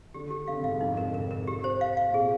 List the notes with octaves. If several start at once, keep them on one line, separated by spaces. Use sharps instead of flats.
D3 G4
G4
D3 F5
C3
G#2 F5
G2
F2 D#4
G#2
C3 A#4
D3
C3 A#4
A#4
G4
C5
F5
F5
A#2
C3 G#4